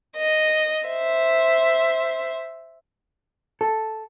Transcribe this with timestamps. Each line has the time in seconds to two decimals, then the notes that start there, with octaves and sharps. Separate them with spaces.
0.17 D#5
0.87 C5 E5
3.61 A4